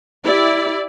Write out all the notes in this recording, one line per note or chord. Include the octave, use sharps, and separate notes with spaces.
E4 G4 D5